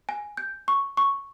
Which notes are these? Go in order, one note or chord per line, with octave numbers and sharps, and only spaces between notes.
G#5
G6
C#6
C#6